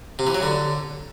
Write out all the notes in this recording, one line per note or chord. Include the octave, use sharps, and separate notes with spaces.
C3
E3
F#3
D3